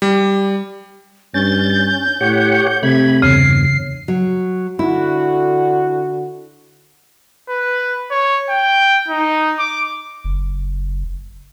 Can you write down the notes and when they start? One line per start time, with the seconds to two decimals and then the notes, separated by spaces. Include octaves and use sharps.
0.02 G3
1.34 G2 C#4 G6 A6
2.21 A2 G4 C#5 F#5
2.83 C3 A3 B5 G#6
3.22 E2 G2 C#3 C7
4.08 F#3
4.79 D3 E4 F#4
7.49 B4
8.11 C#5
8.50 G5
9.08 D#4
9.59 D6
10.24 F#1